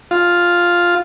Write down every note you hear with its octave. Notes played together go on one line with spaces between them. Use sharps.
F4